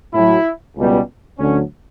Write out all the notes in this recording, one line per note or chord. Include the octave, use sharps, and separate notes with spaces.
A2 F#3 E4
C#2 B2 G3
D2 D3 F#3 C#4